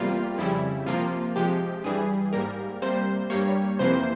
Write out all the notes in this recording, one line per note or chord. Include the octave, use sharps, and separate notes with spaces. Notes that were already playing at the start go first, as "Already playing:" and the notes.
Already playing: E2 C3 G3 A#3 F4
F2 C#3 G3 E4
C3 F3 A#3 F4
C3 F3 G#3 G4
G2 E3 G3 G#4
G#2 G3 A#3 A#4
C3 G3 A#3 C5
G2 G3 A#3 C#5
F2 C3 E3 A#3 C5